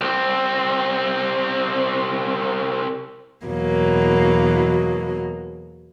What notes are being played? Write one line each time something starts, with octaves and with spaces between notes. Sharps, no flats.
C2 C4
E2 B2 F#3 A#3